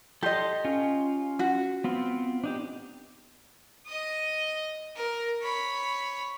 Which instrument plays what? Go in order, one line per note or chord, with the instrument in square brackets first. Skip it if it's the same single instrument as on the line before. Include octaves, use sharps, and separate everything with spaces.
[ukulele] G4 D#5 [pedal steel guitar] A4 C6
[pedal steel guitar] C#4 F4
[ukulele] F#4
[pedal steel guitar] B3 C4 F4
D4 D#4 G4
[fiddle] D#5 D#6
A#4
C#5 B5